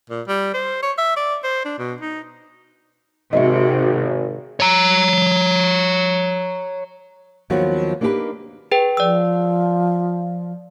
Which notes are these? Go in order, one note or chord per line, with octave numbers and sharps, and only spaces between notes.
A#2
G3
C5
C#5
E5
D5
C5
D4
B2
D#4
G#1 C3 F#4 D#5 E5
C#5 A#5
D#2 D#3 F3 F#3 B3 F#4
A#3 D4 D#4 F#4 G4 B4
G#4 B4 G5
F3 D5 E6